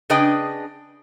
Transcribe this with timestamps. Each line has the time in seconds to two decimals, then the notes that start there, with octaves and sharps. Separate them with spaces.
0.10 C#3 D4 G#4 B4 D#5 G5